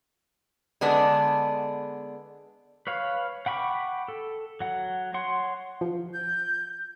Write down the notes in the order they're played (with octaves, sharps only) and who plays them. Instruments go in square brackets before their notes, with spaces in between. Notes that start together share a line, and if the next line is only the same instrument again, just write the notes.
[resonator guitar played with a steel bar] D3 G#3 B3 D4
[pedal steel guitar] B4 C#5 F5
F#5 G5 B5 C#6 D6
A4
F#3 F#5
C#5 F#5 C6
[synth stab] F3
[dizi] G6